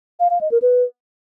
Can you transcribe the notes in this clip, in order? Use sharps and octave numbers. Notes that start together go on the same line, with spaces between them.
F5
F5
D#5
A#4
B4